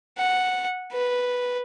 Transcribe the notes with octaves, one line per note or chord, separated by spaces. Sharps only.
F#5
B4